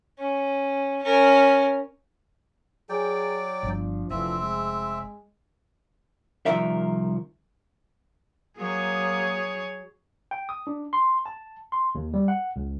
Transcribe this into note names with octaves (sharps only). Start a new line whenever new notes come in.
C#4
C#4 A#4
F#3 G#4 D5 G5
G1 F3 D4
F1 D3 E3 F3 C4 E5
G#3
C2 A#2 D#3 F3 A#4 E5
F#3 A#3 G#4 C#5 D#6
G5
D#6
D4
C6
A5
C6
D#2
G3
F#5
C#2